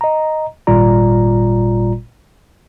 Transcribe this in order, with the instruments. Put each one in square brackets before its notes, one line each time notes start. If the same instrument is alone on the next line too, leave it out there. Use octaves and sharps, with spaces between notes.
[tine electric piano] D#5 A#5
G#1 A#2 G3 F4 D5 A#5